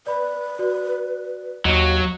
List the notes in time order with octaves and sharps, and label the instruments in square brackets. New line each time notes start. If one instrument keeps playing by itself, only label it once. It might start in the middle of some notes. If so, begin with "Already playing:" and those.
[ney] B4 [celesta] D5 B5
[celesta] F#4 D5
[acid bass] D#2 [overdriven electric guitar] F#3 [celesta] D#5 C#6